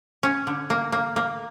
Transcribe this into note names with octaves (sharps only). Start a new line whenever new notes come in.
C#4
D3
A#3
A#3
A#3